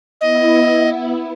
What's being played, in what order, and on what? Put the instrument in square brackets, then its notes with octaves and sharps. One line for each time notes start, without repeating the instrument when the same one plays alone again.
[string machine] B3 E4 [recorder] D#5